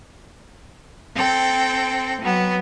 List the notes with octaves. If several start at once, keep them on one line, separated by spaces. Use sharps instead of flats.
C4 A4 G5
F#3 B3